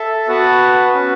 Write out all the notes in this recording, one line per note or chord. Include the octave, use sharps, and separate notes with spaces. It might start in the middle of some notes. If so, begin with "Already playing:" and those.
Already playing: A4 E5 A5
B3 F#4 B4 F#5 A5
C#4 F#4 B4